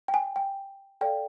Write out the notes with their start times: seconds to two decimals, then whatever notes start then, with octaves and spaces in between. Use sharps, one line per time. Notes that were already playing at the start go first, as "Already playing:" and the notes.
0.08 G5
0.14 G#5
0.36 G5
1.01 A4 D5 F5 G5